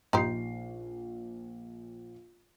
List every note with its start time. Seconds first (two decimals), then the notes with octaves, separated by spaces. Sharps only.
0.13 A#1 D#4 G4 C5 C7